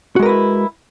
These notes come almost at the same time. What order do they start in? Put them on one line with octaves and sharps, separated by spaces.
F#4 G#3 A#4 B4 E4